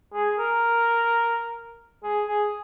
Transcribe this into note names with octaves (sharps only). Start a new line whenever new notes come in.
G#4
A#4
G#4
G#4